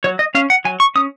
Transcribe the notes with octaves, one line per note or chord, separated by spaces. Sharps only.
F#3 C#5
D#5
C#4 F5
F#5
F#3 G#5
C#6
C#4 D#6